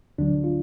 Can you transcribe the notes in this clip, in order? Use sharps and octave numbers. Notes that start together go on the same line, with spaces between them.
D2 D3 F#3 D4
F4